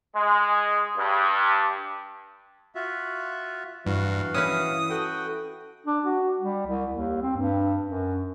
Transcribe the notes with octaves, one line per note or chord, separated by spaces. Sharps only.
G#3
G2
F4 F#4 E5
G2 E3 F#4 F5
C#4 E4 B4 D#6
F#4 A4 G5
D4
F#4
G3
C2
D#2
C4
G2
F#2